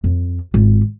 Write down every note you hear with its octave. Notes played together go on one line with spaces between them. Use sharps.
F2
G#1 F4